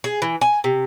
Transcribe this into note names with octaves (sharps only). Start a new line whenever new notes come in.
G#4
E3
G#5
C3